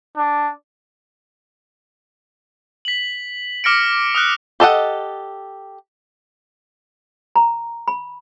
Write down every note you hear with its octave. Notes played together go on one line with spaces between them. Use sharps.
D4
B6 F#7
D6 F6 A#6 C#7 D7
D#6 F6 F#6
G4 A4 D#5 F#5
A#5
B5